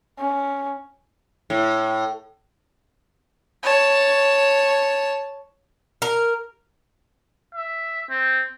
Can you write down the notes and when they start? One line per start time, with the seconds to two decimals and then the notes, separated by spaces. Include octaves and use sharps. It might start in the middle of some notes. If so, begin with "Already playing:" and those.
0.18 C#4
1.50 A2
3.63 C#5 A5
6.02 A#4
7.55 E5
8.10 C4